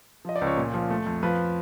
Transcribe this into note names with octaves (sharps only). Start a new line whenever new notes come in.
F3 D#5
D5
C#2
C#5
A#2
F3
A3
F2
F3 B4